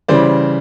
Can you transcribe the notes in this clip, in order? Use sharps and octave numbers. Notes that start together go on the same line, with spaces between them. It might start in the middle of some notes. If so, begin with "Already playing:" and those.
C#3 E3 G3 C5 D5